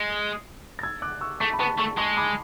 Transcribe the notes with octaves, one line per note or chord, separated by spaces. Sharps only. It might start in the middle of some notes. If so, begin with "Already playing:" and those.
Already playing: G#3
A6
E6 G#6
D6 F#6
C#6 E6
A3 A5 C#6
B5
B3 A5 C#6
A3 A5 C#6
G#3 A5 C#6
B5 D6